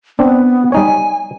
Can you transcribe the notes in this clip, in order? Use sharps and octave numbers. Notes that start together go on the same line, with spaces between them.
B3 C4 D4
G3 D#4 C#5 G#5